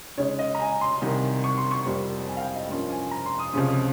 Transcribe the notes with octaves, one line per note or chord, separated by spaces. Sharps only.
C#3 G#3 D#4 C#5
D#5
A#5
G#5
C6
C2 C3 D#3 G3
C#6
C6
C#6
F2 C3 G3 A#3
G#5
F5
G5
D#5
G2 F3 A#3 C#4 F4
G#5
A#5
C6
D#6
C#2 C3 F3 G#3 C#4